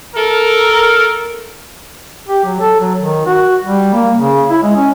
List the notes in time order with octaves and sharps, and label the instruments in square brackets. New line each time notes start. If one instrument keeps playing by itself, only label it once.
[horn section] A4 A#4
[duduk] G4
F#3
A4
F#3
D#3
F#4
G3
A#3
C#3
E4
G#3
C#4